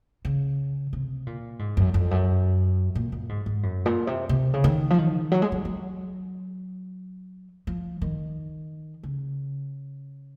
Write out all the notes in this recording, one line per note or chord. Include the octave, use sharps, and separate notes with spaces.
C#3
C3
A#2
G#2
F#2
F2
F#2
A#2
A#2
G#2
G#2
F#2
A#2
C3
C3
C#3
D#3
F3
D#3
F#3
G#3
F#3
F#3
F3
D#3
C#3